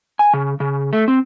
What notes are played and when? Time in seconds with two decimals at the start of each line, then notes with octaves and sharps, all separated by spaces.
0.19 G#5
0.34 C#3
0.60 C#3
0.93 A3
1.08 C4